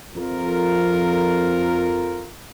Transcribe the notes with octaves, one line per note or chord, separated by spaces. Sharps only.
F2 F4 A#4